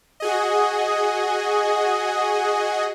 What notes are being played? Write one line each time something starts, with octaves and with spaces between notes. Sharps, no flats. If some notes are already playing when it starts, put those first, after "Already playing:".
F#4 G#4 D#5